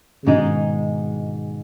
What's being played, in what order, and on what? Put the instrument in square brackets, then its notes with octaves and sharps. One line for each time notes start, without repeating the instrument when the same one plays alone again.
[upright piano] C#3
[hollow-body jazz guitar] G#2 G#3 D#4 [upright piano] B2 D#3